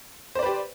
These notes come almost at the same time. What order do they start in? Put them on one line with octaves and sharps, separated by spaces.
C5 D5 B4 G4